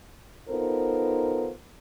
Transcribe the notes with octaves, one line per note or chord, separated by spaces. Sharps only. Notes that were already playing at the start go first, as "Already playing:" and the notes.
B3 D#4 F4 A4 A#4 C5